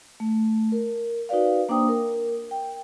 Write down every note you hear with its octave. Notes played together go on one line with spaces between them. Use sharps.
A3
A#4
D#4 F#4 B4 D5 F5
A#3 D4 C5 G5 D#6
A#4
G5